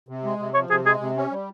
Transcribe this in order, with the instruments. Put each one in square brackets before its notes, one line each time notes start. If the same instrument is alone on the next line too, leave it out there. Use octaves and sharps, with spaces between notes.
[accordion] C3
G#3
C3
[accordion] F3 [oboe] C#5
[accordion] C3 [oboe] G#4
[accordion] G#3 [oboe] G#4
[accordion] C3
C#4
G3